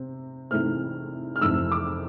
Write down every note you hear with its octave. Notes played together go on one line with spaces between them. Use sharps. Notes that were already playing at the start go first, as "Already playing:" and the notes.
Already playing: C3 C4
C3 E3 A3 C4 F6
F6
F2 C3 E3 A3 E6
D6